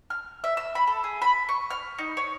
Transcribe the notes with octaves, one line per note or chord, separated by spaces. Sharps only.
F6
E5
E6
B5
A4
G#4
B5
C#6
F6
D#4
C#5